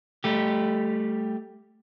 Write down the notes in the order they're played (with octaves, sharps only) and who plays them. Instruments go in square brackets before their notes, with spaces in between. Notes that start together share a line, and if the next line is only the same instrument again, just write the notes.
[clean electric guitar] G3 A3 G4